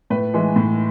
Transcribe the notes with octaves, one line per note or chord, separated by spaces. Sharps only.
A2 B4
E3 G#3
A2